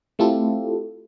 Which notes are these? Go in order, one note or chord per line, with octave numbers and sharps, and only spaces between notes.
A3 C4 E4 F4 G4 A4